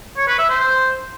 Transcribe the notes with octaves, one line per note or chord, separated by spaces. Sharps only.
C#5
B4
E5
C5